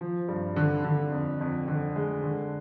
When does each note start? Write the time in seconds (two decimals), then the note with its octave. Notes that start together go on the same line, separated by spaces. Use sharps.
0.01 F3
0.29 G2
0.56 D3
0.84 D3
1.12 F2
1.41 F2
1.68 D3
1.96 G#3
2.24 D3